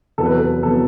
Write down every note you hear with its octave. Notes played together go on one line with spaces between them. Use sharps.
E2 C3 F#3 B3 A4
B4
A4
B4
C3 F#3 B3 A4